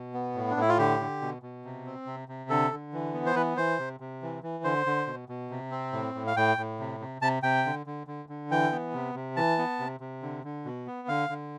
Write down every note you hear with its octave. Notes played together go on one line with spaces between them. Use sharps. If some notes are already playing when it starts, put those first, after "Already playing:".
Already playing: B2
B3
A2
D4
A2 E4
F4
D3 G4
D3
B2
B2
C3
C4
C3
C3
D3 A4
D3
E3
B3
C5
E3 B4
E3 C5
C3
C3
E3
E3
D3 C5
D3
B2
B2
C3
C4
A2
A2
F5
A2 G5
A2
C3
C3
C3 A5
C3 G5
D3
D3
D3
D3
E3 G5
B3
C3
C3
E3 A5
B3
C3
C3
D3
D3
B2
B3
D3 F5
D3